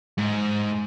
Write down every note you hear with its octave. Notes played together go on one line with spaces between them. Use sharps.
G#2